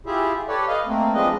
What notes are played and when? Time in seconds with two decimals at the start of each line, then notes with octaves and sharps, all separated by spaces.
0.06 E4 F4 G4 G#4 E5
0.48 G4 A4 B4 C#5 D5
0.68 B4 D#5 F5
0.86 A3 A#3 C4
1.14 F3 G#3 C4 D4 B4 D#5